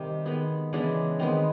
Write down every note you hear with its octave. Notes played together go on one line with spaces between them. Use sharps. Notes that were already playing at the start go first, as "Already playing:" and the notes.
Already playing: C3 D#3 G3 D#4
D#3 G#3 B3
C#3 E3 G#3 B3 D4
D#3 G#3 B3 C4